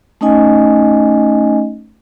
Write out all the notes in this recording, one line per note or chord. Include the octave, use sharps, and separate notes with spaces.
A3 C#4 D#4 D#5 G#5